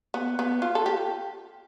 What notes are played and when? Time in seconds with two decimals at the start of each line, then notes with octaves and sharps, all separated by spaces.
0.14 B3
0.39 B3
0.62 F4
0.75 A4
0.86 G4